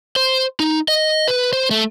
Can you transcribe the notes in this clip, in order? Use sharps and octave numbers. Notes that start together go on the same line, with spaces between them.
C5
D#4
D#5
B4
C5
A3